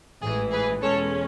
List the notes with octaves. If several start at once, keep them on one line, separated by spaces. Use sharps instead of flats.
A1 G#2 E3 G#4
G#4 B4
E2 B2 G#3 C#4 A4 C#5